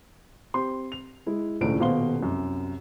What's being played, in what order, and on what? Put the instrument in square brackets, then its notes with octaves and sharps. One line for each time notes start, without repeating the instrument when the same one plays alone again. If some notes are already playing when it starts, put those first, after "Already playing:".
[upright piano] C4 G4 C6
F7
G#3 E4
D#1 C#2 A2 A3 D4 D7
D#1 B2 C5 F5 C6 G7
C2 F#2